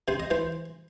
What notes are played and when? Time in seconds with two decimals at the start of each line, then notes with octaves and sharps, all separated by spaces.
0.08 C3 C5
0.20 D#5
0.31 E3 C5